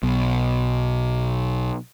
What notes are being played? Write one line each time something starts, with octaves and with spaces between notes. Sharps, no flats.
B1 B2